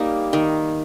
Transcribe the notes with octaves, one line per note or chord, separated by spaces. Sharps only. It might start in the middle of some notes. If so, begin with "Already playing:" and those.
Already playing: G3 A#3 D#4
D#3